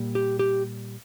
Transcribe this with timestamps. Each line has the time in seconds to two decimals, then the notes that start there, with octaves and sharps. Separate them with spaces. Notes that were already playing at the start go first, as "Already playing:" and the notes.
Already playing: A#2 G3 A#3
0.15 G4
0.39 G4